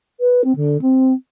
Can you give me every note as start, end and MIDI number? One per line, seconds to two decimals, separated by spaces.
0.20 0.42 71
0.44 0.52 60
0.56 0.80 50
0.81 1.12 60